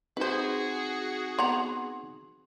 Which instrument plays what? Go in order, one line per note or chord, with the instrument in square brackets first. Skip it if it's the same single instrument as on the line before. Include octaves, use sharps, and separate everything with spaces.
[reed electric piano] C4 D#4 [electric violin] F#4 G#4 [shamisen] B4 C5
[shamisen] B3 F#5 A#5 [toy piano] C6